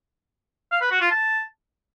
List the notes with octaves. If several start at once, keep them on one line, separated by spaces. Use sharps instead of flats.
F5
B4
F#4
F4
A5